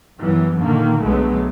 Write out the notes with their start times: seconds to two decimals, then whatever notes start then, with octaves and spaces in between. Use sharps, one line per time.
0.19 F#2 E3 G3 B3
0.57 A#2 D3 D#3 A#3
1.02 B1 D3 F#3 G#3 A3 B3